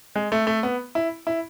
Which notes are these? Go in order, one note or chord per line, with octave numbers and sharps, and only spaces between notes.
G#3
A3
A3
B3
E4
E4